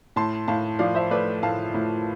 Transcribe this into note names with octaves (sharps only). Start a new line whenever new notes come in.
A2 A5 C6
A2 F5 A5
F3 D5 F5
C5 E5
A3 B4 D5
A2 F5 A5
A2